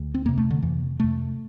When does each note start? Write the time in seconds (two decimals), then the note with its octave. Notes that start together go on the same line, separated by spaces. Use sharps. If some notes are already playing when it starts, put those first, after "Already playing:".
Already playing: D2
0.14 C4
0.25 F2 C3 A#3
0.38 A3
0.51 D3
0.62 F2 C3 E3
1.00 F2 C3 A3